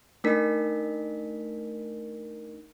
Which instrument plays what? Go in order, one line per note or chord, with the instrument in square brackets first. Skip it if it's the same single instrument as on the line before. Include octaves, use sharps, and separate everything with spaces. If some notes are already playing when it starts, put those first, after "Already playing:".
[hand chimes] A3 D4 D#4 A#4 B6